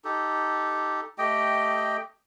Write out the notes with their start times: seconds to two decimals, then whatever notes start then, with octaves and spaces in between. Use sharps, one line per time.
0.04 D#4 G4 A4
1.18 A3 G4 D#5 G5